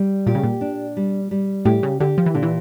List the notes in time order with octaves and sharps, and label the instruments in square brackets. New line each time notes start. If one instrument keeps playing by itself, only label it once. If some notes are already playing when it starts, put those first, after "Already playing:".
Already playing: [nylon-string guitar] G3
[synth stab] A#2 [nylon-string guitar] G4
[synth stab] C#3
A#2
[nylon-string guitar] D4
G3
G3
[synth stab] A2 [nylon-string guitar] G4
[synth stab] C#3
[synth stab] D3 [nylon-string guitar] G4
[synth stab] F3
E3
[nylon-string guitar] A#2 [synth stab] D3
[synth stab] E3